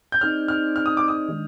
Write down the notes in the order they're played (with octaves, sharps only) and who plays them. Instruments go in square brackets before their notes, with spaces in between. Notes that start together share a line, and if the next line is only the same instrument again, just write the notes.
[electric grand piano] G6
[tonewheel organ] C4 D#4 G#4 D5 [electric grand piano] F6
[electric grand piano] F6
F6
D#6
D6
D#6
[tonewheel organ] D#3 G#3 D4